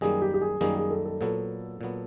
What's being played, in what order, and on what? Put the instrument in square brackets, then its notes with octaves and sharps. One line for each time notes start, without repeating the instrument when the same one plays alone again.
[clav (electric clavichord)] F#2 D#3 G3 A#3 [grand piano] G#4
[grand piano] G4
G4
G#4
[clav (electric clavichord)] F#2 D#3 G3 A#3 [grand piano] G#4
[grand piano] G#4
A4
A4
[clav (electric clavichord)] A#2 F#3 B3 [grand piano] A4
[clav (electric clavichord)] A#2 F#3 B3